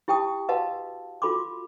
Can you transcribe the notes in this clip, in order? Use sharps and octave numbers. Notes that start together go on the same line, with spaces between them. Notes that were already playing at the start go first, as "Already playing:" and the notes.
E4 G4 G5 A5 D#6
F#4 B4 D#5 F5 F#5 A5
F4 F#4 A4 B5 C6 D6